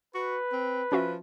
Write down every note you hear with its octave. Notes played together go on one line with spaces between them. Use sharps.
F#4 B4
C4
F3 C#4 F#4 E5